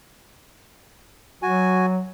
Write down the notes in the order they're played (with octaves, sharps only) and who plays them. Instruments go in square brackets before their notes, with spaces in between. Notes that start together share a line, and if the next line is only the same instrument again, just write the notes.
[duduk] F#3 [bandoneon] F#4 G#5